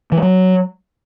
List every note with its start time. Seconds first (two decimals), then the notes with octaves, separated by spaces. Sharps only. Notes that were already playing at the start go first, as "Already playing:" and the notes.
0.12 E3
0.17 G#3
0.22 F#3